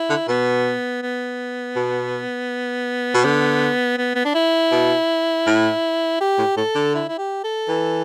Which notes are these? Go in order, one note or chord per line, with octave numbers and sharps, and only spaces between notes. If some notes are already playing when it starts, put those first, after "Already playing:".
Already playing: E4
D3
B2 B3
B3
B2
B2
D3
B3
B3
D4
E4
B2
A2
G4
A2
A2 A4
D3
E4
E4
G4
A4
E3